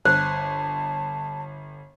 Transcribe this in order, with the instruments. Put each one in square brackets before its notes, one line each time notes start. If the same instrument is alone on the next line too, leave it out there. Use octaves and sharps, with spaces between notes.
[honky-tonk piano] G1 [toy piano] C5 [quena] A5